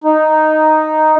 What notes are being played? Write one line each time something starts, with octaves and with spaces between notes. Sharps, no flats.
D#4